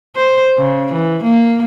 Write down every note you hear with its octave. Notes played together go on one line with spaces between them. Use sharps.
C5
C#3
E3
A#3